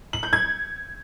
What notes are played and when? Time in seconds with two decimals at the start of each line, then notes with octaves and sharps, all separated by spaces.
0.13 F#7
0.23 G6
0.33 G#6